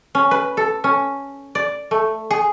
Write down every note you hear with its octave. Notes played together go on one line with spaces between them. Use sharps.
C#4
B4
A4
C#4
D5
A3
G#4